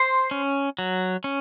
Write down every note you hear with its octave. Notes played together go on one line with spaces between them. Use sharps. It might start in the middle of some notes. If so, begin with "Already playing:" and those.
Already playing: C5 C6
C#4
F#3
C#4